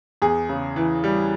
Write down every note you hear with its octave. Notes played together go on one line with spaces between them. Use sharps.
E2 G#4
C#3
E3
G3